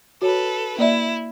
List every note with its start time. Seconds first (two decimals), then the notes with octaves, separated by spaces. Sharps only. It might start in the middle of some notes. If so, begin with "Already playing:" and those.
0.22 F#4 A4 B4 C#5
0.78 A#3 E4 D5 E5